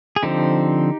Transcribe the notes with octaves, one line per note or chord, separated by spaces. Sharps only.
G#4
D3 F3 C4 D#4 G4